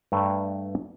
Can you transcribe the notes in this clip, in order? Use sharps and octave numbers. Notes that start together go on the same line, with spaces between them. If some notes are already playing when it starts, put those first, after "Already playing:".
G2 A3 B4 D5 G5 A#5